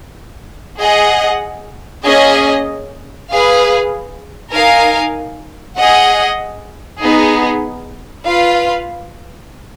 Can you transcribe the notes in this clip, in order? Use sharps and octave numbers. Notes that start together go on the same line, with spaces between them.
G#4 D#5 F#5
A#3 C#4 G#4 D#5
G#4 B4 F5
D#4 A#4 F5 G#5
G#4 D#5 F#5
B3 D#4 G#4
F4 B4 F5